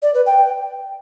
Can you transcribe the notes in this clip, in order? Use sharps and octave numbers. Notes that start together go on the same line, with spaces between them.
D5
B4
G5